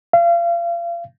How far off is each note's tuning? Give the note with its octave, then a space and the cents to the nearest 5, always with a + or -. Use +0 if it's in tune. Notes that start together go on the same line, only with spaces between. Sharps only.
F5 -35